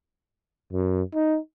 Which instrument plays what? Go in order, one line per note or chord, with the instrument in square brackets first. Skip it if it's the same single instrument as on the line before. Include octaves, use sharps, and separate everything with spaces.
[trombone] F#2
D#4